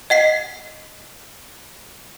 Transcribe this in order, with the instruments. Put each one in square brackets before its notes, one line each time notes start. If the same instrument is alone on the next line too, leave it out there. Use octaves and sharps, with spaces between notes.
[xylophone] D#5 F#5 B6 C7